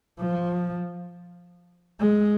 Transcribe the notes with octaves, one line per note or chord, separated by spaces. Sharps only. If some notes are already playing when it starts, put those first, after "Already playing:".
F3
G#3